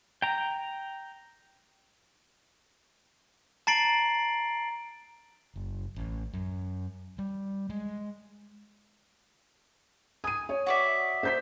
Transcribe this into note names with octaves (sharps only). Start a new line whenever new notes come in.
G5 A#5
A5 A#5 A6 C7 D7 F#7
F#1
A1
F#2
G3
G#3
G#5 D#6 D#7
C#5
F#4 D5 E5
C5 G6 B6